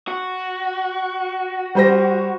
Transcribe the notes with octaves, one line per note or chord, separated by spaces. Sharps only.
F#4
G3 C5 A#6